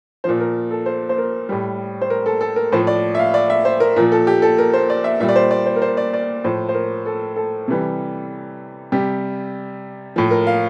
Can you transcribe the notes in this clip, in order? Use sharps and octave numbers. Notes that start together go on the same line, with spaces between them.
A#2 F3 C5
A#4
A4
C5
C5
A#4
A2 G3
C5
A#4
A4
A4
A#4
A2 F3 C5
D5
E5
F5
D5
E5
C5
A#4
A#2 F3 A#4
A4
G4
A4
A#4
C5
D5
E5
A#2 G3 E5
D5
C5
D5
C5
A#4
C5
D5
D5
A2 F3 C5
C5
A#4
A4
A4
C3 E3 G3
C3 G3 G4
A2 F3
A#4
F5